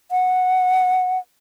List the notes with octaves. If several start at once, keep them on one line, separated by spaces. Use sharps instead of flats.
F#5